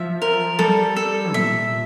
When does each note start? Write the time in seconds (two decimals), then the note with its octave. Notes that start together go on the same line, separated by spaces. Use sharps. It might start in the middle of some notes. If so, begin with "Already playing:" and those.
Already playing: F3 E5
0.22 A#4
0.59 G3 A4
0.96 A4
1.34 A#2 E5